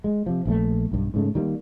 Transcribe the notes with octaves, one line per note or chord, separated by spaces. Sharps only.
G#3
C3 F3
A#1 D#3 A3
B1 G2
G#2 C#3 A3
D#3 G3 A#3